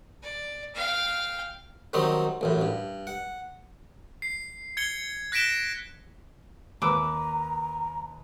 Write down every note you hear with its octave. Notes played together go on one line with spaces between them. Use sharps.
D5
F5 G5
D#3 F#3 G3 C4 D#4
A1 F#2 A2
G2
F#5
C7
G#6 C#7 G7
F#6 A#6 B6 D7 E7 G7
D#2 B4 A#5 D6 E6